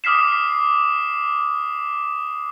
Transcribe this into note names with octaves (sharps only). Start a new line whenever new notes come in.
D6 D#6 F6 B6 C7 E7